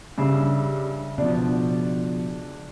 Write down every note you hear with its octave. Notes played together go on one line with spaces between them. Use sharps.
G2 C#3 E5 C7
B2 F3 D4